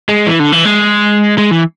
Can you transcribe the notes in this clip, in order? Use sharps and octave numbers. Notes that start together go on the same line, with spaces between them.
G#3
E3
D3
E3
G#3
G#3
E3